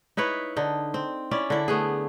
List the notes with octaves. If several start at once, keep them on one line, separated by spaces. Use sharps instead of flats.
D#4 E4 B4 C#5
D3 D#4
C4
C#4 E4 D5
D3 E4
A3 B3 G#4